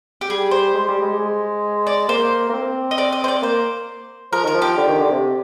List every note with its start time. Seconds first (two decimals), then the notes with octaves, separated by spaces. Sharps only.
0.21 G4
0.30 G3 G#4
0.51 C5
0.74 G#3
0.88 G3
1.02 G#3
1.19 G#3
1.87 D5
2.08 A#3 C5
2.49 A#3
2.53 C4
2.91 D#5
2.98 D5
3.13 D#5
3.24 C5
3.28 D5
3.42 A#3 C5
4.32 F3 A#4
4.44 D#3 A#4
4.54 F3
4.62 G4
4.77 D3
4.88 D#3
4.99 D3
5.11 C3